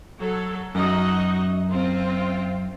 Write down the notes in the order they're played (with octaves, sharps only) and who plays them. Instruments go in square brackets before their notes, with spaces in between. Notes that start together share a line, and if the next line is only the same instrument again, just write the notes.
[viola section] F#3 A4
[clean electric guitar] F#2 [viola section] D#4 F#4 D#5
[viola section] C4 F4